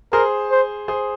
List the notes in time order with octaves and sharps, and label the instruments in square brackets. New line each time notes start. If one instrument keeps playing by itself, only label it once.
[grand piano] G#4 C5 [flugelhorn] A#4
[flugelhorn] C5
[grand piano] G#4 C5